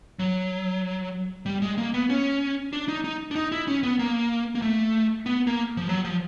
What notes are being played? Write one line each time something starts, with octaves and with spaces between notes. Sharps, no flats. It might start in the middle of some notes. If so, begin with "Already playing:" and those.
F#3
G3
G#3
A#3
B3
C#4
D4
D#4
D#4
D4
D#4
E4
C#4
B3
A#3
A#3
A3
B3
A#3
F3
F#3
F3